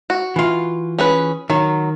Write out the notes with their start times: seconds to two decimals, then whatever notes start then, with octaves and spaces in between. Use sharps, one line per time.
0.10 F#4
0.36 E3 F4
0.99 C#4 G#4 B4
1.50 D#3 F#3